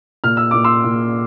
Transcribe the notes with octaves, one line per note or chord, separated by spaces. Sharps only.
A#2 F6
E6
A#2 D6
C6 E6
A#2